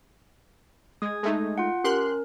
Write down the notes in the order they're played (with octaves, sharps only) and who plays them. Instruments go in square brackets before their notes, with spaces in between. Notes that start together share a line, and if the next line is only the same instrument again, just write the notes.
[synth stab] G#3 [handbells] D#6 G#6
[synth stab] G#3 A3 D#4
[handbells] F4 F#5
[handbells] C#4 A#4 [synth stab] G4 C6 F#6